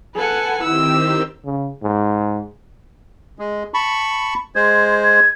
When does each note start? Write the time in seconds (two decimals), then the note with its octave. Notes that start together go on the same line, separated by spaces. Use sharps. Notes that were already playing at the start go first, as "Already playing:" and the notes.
0.15 A4 B4 F#5 G#5
0.63 D#3 C4 E4 G4 E6
1.45 C#3
1.83 G#2
3.39 G#3
3.74 A5 B5 C#6
4.56 G#3 C5 G#6
5.04 G#6